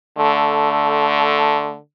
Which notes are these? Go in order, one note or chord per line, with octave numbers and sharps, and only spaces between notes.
D3 A3